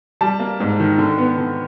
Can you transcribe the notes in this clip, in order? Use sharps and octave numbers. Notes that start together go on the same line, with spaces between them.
G3 A5
A#3
G#2
D#3
D3
B3
D3